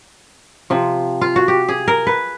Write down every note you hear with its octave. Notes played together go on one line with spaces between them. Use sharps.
C3 F3
F4
F#4
G4
G#4
A#4
B4